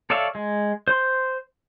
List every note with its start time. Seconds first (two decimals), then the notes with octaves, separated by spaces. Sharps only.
0.10 A4 C#5 D5 E5 F5
0.35 G#3
0.88 C5 C6